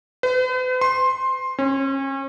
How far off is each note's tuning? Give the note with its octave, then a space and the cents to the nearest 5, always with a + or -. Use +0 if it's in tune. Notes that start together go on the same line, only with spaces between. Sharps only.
B4 +45
C6 +15
C#4 -35